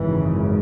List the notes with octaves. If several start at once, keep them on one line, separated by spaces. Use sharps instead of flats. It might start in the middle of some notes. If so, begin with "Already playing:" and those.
Already playing: G#1 F#2 C#3 E3